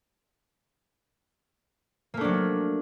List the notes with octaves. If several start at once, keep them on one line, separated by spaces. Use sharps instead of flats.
F#3 A3 A#3 D4